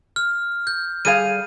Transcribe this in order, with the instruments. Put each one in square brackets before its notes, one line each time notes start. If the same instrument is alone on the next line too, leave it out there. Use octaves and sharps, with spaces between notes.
[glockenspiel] F6
G6
[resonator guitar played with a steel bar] G3 G#4 F5 [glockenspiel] D#7